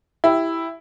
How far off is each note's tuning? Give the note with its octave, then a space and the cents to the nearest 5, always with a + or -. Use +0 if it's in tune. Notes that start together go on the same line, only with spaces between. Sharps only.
E4 +0 G4 +0